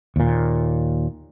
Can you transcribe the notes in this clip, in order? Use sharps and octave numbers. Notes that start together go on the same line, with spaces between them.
D#2 A#2